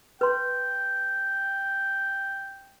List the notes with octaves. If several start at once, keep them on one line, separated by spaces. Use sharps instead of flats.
B4 G5 C6